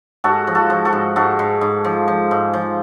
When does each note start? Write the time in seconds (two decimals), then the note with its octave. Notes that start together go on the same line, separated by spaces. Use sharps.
0.24 G#2 F#4 A4
0.47 F3
0.55 F#4 A4
0.70 F3
0.85 F#4 A4
0.93 G#2
1.16 G#2 F#4 A4
1.39 G#2
1.61 G#2
1.85 F3
2.08 F3
2.31 G#2
2.53 F3